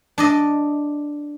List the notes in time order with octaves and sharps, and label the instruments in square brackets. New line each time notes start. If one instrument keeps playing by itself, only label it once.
[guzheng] D4 D5 D#5